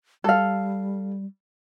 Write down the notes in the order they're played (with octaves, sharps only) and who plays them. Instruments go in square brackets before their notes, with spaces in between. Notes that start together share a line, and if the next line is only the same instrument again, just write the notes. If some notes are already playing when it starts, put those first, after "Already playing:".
[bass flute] G3 [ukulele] A4 F5